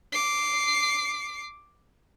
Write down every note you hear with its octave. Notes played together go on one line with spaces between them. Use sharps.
D6 C7